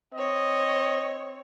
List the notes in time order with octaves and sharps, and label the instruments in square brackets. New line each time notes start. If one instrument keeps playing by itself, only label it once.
[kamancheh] C4 C#5 [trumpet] D#5